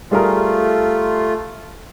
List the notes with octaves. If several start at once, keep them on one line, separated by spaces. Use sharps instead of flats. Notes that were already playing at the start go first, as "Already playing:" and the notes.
G3 A3 F4 G#4 A#4